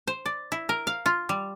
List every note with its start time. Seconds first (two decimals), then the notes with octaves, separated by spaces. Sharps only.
0.07 C5
0.26 D5
0.52 E4
0.69 A#4
0.87 F5
1.06 F4
1.29 G3